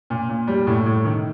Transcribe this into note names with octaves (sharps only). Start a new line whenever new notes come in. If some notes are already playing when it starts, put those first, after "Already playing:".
A#2
A#2
G3
A2
A2
D#3